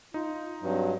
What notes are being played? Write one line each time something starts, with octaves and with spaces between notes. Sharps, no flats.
D#4 F4
G2 F#3 C4